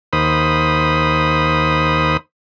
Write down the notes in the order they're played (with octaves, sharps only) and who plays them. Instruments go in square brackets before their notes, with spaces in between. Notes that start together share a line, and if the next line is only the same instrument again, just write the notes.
[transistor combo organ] D#2 C5 B5 D#6